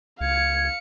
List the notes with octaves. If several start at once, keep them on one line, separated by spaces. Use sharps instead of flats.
C#2 F5 G#6 C#7